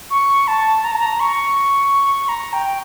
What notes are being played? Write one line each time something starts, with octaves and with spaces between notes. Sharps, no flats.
C#6
A5
A#5
A5
A#5
C#6
A#5
G5